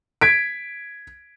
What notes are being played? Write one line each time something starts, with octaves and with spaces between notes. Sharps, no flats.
G#6 B6 D7